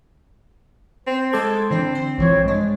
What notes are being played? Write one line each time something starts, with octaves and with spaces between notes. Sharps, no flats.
C4 C5
G#3 A4 D6 G#6
D3 E3 C4 D4
C5
A#1 E3 F3 C#5
G2 G#3 D4